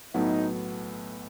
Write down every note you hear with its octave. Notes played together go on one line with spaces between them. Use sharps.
B1 A2 F#3 B3 D#4